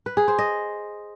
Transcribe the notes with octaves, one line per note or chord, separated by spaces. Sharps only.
B4
G#4
C5
D#5